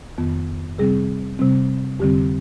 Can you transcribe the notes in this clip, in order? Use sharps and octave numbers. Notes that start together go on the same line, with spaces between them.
F2 D#3 B3
C3 G3 C4 G#4
C3 G3 C4
F2 D3 G3 C4 G4